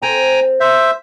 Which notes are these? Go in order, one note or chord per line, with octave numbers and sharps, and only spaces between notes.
C4 A4 G5 G#5 A#5
C5 E5